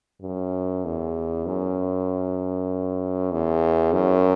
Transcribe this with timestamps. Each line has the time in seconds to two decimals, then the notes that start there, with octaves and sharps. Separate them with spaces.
0.22 F#2
0.85 E2
1.46 F#2
3.32 E2
3.93 F#2